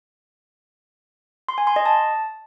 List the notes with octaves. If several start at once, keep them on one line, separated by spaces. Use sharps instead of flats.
C6
G#5
C6
D#5
A5